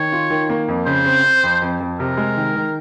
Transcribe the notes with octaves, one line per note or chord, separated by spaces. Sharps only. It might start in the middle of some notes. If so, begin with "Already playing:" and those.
Already playing: D#3 C#5
F4
D#3
A#3
F2
C#3 C5
C4
C4
F2
F2
F2
C3 A#4
G#3
D#3
D#3